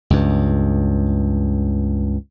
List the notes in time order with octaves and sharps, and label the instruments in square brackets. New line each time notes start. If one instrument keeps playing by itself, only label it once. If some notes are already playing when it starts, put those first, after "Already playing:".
[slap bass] C#2 G2